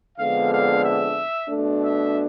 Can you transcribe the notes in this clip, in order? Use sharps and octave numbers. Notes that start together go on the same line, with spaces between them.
F2 D3 G#3 B3 D4 F5
F5
E5
B2 A3 D4
E5